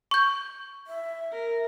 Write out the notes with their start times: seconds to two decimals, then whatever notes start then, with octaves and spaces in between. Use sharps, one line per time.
0.11 C#6 G6
0.87 E5
1.32 A#4